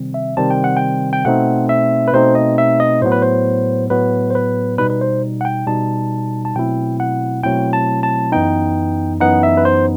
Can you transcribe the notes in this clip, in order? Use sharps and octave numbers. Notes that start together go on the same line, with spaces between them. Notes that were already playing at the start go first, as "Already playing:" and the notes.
Already playing: C3 D#3 G3 C4
E5
C3 D#3 G3 C4 A5
G5
F#5
G5
G5
B2 A3 C4 D#4 F#5
E5
B4
B2 A3 C4 D#4 C5
D#5
E5
D#5
A2 F#3 B3 C5
B4
C5
A2 F#3 B3 B4
C5
B4
B2 G3 D#4 B4
B4
C5
F#5
G5
B2 G3 D#4 A5
A5
B2 F#3 A3 C4 E4 G5
F#5
B2 F#3 A3 C4 E4 G5
A5
A5
F#2 E3 B3 D#4 G5
F#2 E3 B3 D#4 F#5
E5
B4
C5